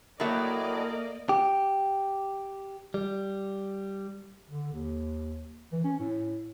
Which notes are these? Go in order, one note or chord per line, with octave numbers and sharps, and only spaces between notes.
A2 F#3 A3 A#3 D5 D#5
G4
G3
D3
D#2
E3
C#4
A2